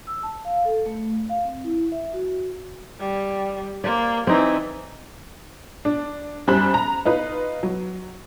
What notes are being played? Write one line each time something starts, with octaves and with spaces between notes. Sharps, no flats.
E6
A5
F5
A4
A3
F5
C4
E4
E5
F#4
G3
A#3 C5 D5
E3 C4 D#4 D5
D4
F#2 G3 C5 B5 F#6
A#5
D#4 F4 B4
F#3